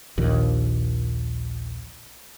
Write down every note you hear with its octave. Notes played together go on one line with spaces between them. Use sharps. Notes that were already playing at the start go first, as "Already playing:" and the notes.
A#1 D#2